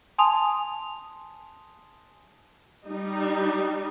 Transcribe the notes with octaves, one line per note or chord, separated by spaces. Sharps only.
G#5 A5 C6 D#6 F7
G3 D#4